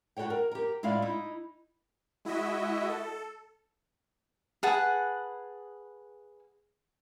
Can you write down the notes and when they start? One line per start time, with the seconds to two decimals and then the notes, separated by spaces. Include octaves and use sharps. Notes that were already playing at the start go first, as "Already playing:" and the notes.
0.17 F#4 G4 A4 C#5 G5
0.30 A#4
0.52 G4 A#4
0.83 A2 G#3 E4 F4 D5 F5
1.02 D#4 E4
2.25 G#3 E4 F#4 D#5 E5
2.89 A4
4.63 G#4 B4 F#5 A5